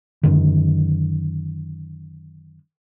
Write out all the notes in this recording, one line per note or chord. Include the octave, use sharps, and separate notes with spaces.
F#2 D3 D#3